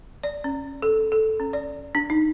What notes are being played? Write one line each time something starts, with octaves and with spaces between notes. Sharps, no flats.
D5
C#4
A4
A4
C#4
D5
D4
D#4